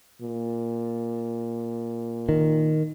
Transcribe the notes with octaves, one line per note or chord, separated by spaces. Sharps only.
A#2
D#3